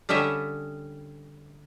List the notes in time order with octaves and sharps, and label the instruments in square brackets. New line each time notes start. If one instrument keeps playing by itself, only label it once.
[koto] D3 G3 C#4 D#5 E5